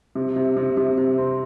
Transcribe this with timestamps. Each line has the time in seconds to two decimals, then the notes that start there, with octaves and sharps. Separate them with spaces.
0.15 C3
0.36 C3
0.57 C3
0.77 C3
0.98 C3
1.18 C4